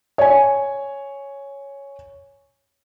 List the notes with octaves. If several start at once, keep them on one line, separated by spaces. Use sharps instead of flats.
C#5 G#5